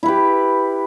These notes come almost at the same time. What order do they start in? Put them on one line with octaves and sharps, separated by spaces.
E4 B4 G4